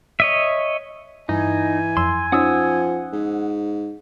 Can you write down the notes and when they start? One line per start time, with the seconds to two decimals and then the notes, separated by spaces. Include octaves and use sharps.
0.20 C#5 D#5 E5
1.29 G2 E3 D#4 G#5
1.97 F2 C6 E6
2.32 F3 C#4 D#4 F#5 D#6 E6
3.13 G#2